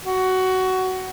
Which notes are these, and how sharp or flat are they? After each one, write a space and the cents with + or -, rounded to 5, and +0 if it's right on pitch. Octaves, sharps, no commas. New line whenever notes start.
F#4 +15